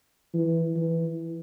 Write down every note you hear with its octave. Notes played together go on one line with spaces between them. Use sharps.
E3
E3